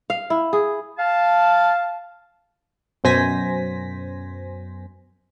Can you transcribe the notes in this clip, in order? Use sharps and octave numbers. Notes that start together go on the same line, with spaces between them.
F5
E4
G#4
F5 A5
F#2 B2 C5 G#5 A#6 B6